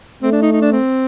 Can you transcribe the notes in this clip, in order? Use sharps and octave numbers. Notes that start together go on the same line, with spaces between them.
A3 C4
D4
D#4
D#4
D4
C4